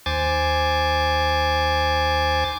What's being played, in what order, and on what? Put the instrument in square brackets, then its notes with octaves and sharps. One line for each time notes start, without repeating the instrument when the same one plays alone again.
[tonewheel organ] D#2 C5 G#5 D6 A6